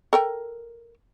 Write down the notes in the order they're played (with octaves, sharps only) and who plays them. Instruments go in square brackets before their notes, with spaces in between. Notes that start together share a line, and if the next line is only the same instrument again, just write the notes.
[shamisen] A4 A#4 G5